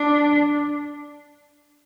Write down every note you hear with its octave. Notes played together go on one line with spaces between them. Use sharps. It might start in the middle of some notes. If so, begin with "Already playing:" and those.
Already playing: D4